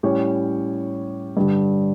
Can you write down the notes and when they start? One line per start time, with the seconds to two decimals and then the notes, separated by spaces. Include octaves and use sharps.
0.03 A2 G3 C#4 G4 C#5
1.37 G2 D3 G3